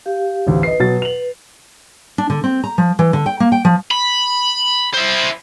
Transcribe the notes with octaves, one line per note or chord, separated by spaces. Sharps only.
G4 F5
A1 D2
B4 D#5 C7
B2 F#3 A6
F7 F#7
D4
D3
C4
A#5
F3
E3
D3
G5
A#3
G5
F3
B5
E4 C5